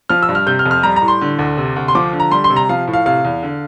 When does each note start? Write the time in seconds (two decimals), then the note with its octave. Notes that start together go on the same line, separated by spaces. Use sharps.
0.09 F3 F6
0.22 E6
0.29 G2
0.35 F6
0.47 C3 G6
0.59 F6
0.66 F2
0.71 F6
0.83 G3 A#5
0.96 A#5
1.02 A2
1.08 C6
1.21 D3
1.39 D2
1.57 C3
1.76 D2
1.88 C6
1.95 F3 D6
2.13 D3
2.20 A#5
2.31 G3 C6
2.44 C6
2.50 C3
2.56 A#5
2.69 F3 F5
2.88 A2
2.93 F5
3.06 C3 F5
3.25 E2
3.43 D3